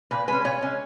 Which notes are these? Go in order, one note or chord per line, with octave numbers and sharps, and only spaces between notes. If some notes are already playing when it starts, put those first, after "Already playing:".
A#2 B4
G#3 C#4 B4
A#2 C#5
G#3 C#4